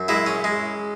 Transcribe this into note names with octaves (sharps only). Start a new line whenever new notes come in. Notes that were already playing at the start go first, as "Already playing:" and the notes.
Already playing: F#2
G#3 E4
C#4
G#3